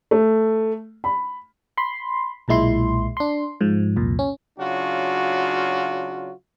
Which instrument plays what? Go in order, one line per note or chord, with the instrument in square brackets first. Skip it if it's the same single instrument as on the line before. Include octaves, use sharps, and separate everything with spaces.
[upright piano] A3
B5
[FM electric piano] B5 C6
B1 A#2 G#3 E4 C6
D4 C6
G#2 F3
C2 F2 A#2
C#4
[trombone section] C#3 F#3 D4 F4 F#4